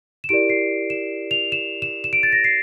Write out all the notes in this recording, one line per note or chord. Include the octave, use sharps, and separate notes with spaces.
E7
E4 G4 A#4 D5 D7
C7
E7
F7
E7
E7
E7
D7
A6
A#6
C7